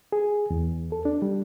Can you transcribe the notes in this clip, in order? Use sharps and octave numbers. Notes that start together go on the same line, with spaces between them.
G#4
E2
A4
D4
G3